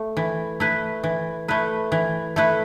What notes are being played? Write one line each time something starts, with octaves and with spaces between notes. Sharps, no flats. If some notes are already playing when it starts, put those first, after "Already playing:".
Already playing: A3
E3
A3 E4 B4
E3
A3 E4 B4
E3
A3 E4 B4